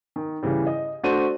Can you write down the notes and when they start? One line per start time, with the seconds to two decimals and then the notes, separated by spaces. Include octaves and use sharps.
0.16 D#3
0.43 C#3 E3 G3
0.67 D#5
1.03 A3 D4 F#4 C5 D#7